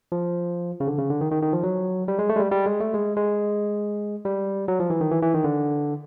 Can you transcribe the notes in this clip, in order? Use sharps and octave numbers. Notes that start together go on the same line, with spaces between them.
F3
C#3
D3
C#3
D3
D#3
D#3
D#3
F3
F#3
G3
G#3
A3
G#3
G3
G3
G#3
A3
G#3
G#3
G3
F#3
F3
E3
D#3
E3
E3
D#3
D3